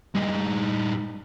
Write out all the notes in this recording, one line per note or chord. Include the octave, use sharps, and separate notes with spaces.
G2 D#4